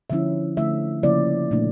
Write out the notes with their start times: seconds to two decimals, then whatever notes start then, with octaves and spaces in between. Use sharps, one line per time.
0.10 D3 F3 C#4 E4 E5
0.57 D3 A3 E4 E5
1.03 C#3 F3 A#3 C#4 E4 D5
1.51 A#2 A3 D4